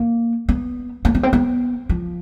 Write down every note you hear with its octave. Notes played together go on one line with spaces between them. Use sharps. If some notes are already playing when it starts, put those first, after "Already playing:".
Already playing: A#3
B3
A#3
B3
C4
B3
F3